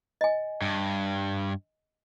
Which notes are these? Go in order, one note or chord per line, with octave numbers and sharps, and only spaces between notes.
D#5 G#5
G2